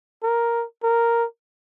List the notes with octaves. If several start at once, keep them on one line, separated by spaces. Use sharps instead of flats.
A#4
A#4